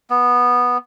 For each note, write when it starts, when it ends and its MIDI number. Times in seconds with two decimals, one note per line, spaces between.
0.10 0.77 59